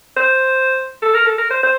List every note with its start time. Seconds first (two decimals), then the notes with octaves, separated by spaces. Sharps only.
0.17 C5
1.02 A4
1.14 A#4
1.26 A4
1.38 A#4
1.51 C5
1.63 C5